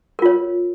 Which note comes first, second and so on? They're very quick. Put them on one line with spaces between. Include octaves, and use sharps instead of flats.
A#4 F4 C#5